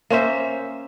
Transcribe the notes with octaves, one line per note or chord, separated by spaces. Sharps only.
A#3 C#4 C5 E5